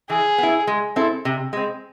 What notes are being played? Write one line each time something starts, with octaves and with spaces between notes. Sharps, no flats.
E3 G#4
B3 E4
G#3
C4 E4 A4
C3
G#3 C4